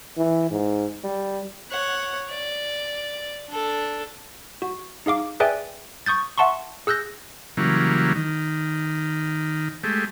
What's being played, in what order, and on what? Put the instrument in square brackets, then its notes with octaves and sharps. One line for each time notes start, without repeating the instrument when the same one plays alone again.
[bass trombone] E3
G#2
G3
[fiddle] C#5 F#5
D5
D4 A4
[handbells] F#4
D#4 G#4 F5 D6
G#4 B4 D5 E5 G5 G#5
C#6 D#6 G6 A6
E5 F#5 A5 C6 C#6
G#4 E6 F#6 G6 A#6
[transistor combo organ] C#3 E3 F#3 G3 A#3
D#3
G#3 A3 G4